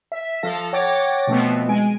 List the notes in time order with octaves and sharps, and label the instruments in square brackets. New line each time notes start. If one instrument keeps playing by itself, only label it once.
[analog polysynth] E5
F3 A4 F5 A#6
C#5 F#5 G5 D6 A6 A#6
B2 F3 A3 B3 C4
G#3 G#5 D7